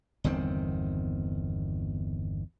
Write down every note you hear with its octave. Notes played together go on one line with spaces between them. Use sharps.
G1 E2 D#3 C4